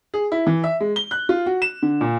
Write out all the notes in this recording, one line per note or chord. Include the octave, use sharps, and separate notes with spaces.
G#4
E4
E3
E5
G#3
G7
F#6
F4
F#4
E7
D3
A#2